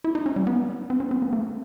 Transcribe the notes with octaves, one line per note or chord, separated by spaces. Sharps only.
E4
D#4
C#4
G3
B3
C4
C#4
C4
B3
A#3